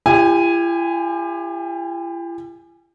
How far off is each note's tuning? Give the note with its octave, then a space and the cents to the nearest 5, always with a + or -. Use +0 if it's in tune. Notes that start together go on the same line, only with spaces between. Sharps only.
E4 +45 G4 +30 G#5 -5